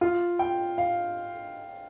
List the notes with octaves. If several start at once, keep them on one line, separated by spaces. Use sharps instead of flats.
F4
G5
F5